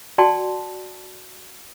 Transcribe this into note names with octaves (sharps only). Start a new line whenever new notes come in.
F#4 D5 G5 A5 C6